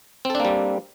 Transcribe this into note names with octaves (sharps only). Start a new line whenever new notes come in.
G3 A#3 C4 D4 A4